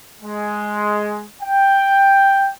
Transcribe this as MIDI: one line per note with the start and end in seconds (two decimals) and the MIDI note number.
0.21 1.24 56
1.42 2.50 79